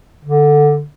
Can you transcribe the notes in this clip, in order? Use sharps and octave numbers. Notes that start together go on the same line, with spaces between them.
D3